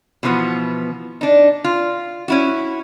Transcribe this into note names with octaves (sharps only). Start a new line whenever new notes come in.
B2 E3 F3 B3
D4 D#4
F4
C#4 E4 F#4